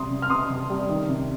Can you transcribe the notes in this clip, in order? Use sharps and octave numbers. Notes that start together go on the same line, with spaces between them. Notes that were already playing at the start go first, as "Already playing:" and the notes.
Already playing: C3 G3 C6 D#6
C3
F6
C3 C6 D#6
C3
G3
D#3
C3